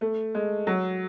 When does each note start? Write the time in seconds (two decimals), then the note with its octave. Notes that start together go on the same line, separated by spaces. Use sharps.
0.01 A3
0.35 G#3
0.67 F#3